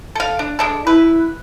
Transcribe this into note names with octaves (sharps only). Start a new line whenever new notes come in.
A4 F5
D4
G#3 D4 A4
E4 B4